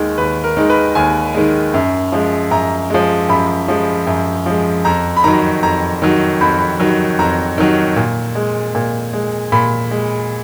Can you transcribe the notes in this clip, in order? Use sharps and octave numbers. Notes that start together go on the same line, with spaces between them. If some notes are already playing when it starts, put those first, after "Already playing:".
Already playing: D#2 D#3 G#3
D#2 B4
A#4
D#3 G#3
B4
D#2 G#5
D#3 G#3
F#2
F3 G#3
F#2 A#5
F3 G#3
F#2 B5
F3 G#3
F#2
F3 G#3
F2 A#5
B5
D#3 F#3 A#5
F2 A#5
D#3 F#3
F2 B5
B5
D#3 F#3
F2 A#5
D#3 F#3
A#2
G#3
A#2
G#3
A#2 B5
G#3